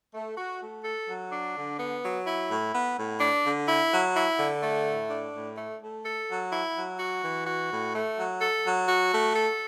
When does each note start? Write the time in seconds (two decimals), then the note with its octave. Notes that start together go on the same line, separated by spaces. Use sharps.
0.14 A3
0.37 F#4
0.61 A3
0.84 A4
1.08 F#3
1.32 D4
1.56 D3
1.79 B3
2.03 F#3
2.27 E4
2.49 A2
2.74 B3
2.97 A2
3.20 D4
3.45 D3
3.68 E4
3.92 F#3
4.16 E4
4.39 D3
4.63 A3
4.86 A2
5.10 D4
5.34 A2
5.57 A3
5.81 A3
6.05 A4
6.28 F#3
6.52 E4
6.76 F#3
6.99 F#4
7.23 E3
7.46 F#4
7.70 A2
7.95 A3
8.17 F#3
8.41 A4
8.65 F#3
8.89 F#4
9.12 A3
9.36 A4